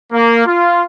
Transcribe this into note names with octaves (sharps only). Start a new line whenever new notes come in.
A#3
F4